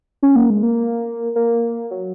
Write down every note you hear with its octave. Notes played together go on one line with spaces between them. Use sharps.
C#4
A#3
G#3
A#3
A#3
F#3